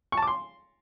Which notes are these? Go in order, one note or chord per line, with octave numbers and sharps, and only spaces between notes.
C#6
A5
D6
C6